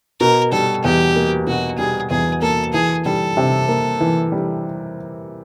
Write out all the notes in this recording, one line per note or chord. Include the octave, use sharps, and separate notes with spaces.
B2 A#4
G3 A4
E2 G4
A#3
B2 F#4
G3 G#4
E2 G#4
A#3 A4
E3 G#4
G3 A4
C3
A#3
E3
G3